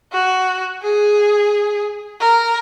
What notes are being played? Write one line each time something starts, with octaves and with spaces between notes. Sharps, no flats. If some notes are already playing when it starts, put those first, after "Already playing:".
F#4
G#4
A#4